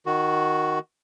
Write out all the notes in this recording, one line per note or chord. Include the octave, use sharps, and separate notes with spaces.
D#3 F#4